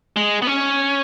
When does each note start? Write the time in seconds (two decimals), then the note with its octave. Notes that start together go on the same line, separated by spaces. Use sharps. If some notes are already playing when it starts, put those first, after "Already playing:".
0.16 G#3
0.42 B3
0.47 C#4